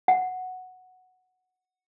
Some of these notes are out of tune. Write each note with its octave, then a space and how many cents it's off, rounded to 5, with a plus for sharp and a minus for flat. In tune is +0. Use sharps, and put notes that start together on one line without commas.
F#5 -5